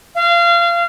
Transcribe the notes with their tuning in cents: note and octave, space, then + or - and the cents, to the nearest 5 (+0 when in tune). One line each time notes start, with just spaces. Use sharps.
F5 -25